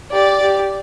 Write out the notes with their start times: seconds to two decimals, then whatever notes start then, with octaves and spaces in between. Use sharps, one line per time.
0.13 G4 D5
0.42 G4